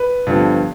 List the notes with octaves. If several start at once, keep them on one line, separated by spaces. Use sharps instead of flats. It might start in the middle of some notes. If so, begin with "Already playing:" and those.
Already playing: B4
G2 D3 F3 B3